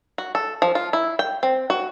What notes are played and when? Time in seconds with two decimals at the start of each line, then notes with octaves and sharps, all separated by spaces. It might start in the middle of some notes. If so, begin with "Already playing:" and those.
0.18 F#4
0.35 A4
0.62 F3
0.75 F4
0.93 E4
1.19 G5
1.43 C4
1.70 F#4